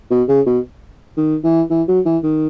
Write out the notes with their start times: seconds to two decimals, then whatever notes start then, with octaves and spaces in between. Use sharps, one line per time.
0.11 B2
0.28 C#3
0.46 B2
1.17 D#3
1.44 E3
1.70 E3
1.88 F#3
2.05 E3
2.23 D#3